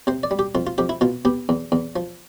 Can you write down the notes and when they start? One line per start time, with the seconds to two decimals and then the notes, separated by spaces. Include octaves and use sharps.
0.07 C3 C5
0.23 D5
0.31 G3
0.39 G4
0.55 F2 F4
0.67 F4
0.78 F2 G4
0.89 E4
1.01 B2 F4
1.25 B3 G4
1.49 E2
1.72 E2
1.96 F3